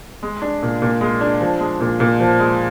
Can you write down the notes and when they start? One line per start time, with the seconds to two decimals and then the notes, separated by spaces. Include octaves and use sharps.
0.23 G#3
0.42 D4
0.62 A#2
0.82 A#2
1.01 G#3
1.21 D4
1.40 F3
1.60 G#3
1.80 A#2
2.00 A#2
2.20 F3
2.40 G#3